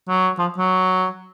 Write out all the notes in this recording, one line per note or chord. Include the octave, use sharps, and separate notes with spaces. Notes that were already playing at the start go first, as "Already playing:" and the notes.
F#3
F3
F#3